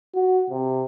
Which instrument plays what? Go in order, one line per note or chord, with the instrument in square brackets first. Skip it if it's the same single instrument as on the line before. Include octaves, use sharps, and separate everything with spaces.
[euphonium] F#4
C3